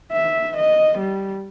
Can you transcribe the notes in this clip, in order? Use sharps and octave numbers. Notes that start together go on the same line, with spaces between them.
E5
D#5
G3